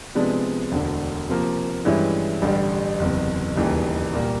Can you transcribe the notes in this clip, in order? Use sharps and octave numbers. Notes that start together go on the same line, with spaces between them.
C3 F3 G#3 B3 D4
E1 D2 D3
C3 F3 A#3
G2 E3 G#3 C#4 E4
A1 G2 D3 G3
F#1 E2 C3
E1 D#2 C#3 E3 G3
C2 A#2 G3 A#3